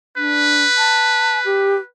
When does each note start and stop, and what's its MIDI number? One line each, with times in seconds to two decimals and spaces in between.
0.17 0.64 62
0.17 1.86 71
0.78 1.40 81
1.45 1.76 67